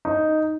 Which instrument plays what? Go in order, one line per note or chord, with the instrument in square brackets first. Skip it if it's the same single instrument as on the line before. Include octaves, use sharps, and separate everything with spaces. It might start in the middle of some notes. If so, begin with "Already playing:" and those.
[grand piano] D#4